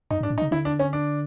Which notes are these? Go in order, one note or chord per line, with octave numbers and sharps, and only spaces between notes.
F#2 D#4
G#2
D4
A2
D#4
C#3
D3 E4
D4
C#4
D4